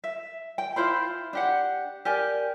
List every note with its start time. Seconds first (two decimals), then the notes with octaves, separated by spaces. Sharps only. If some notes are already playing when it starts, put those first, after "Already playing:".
0.04 E5
0.58 G5
0.76 E4 F4 C5 B5
1.33 D4 G4 F#5
2.05 G4 A#4 D5 G#5